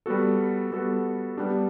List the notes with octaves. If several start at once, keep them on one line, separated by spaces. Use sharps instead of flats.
G3 B3 F#4 A4
G3 B3 F#4 A4
G3 B3 D4 G4